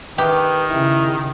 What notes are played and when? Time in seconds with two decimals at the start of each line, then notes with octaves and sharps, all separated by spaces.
0.18 D#3 G4 B4
0.71 C#3 E4